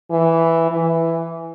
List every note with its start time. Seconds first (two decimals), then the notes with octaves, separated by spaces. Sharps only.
0.11 E3
0.71 E3